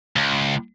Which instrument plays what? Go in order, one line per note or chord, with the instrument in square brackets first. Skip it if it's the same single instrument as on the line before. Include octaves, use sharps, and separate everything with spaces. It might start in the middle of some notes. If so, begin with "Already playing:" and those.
[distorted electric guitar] C#2